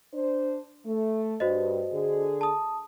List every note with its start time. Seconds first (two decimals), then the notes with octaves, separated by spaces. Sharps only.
0.13 D4 C5
0.85 A3
1.40 G2 F#4 C5 D#5
1.91 D3 G#4
2.41 A5 D#6